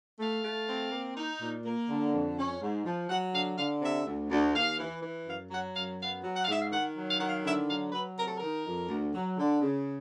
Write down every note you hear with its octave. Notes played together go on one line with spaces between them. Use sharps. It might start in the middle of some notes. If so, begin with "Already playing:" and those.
A3 F5
A3
C4
A#3
D#4
A#2
A#3
D3
F2
C#4
G#2
F3
F#3 F#5
D3 F5
D3 F5
C3 E5
D2
D2
D#2 F5
E3
E3
F#2 F5
F#3 F#5
F#2 F5
B3 F5
F#3
F#5
F5
G#2 E5
F5
D#3 F#5
F#3
F5
D#3 F#5
F5
D3 E5
F#3 F5
F#3 B4
C3 A#4
A4
D#3 A#4
F2
D2
F#3
D3
C#3